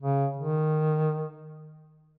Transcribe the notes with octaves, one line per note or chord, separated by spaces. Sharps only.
C#3
D#3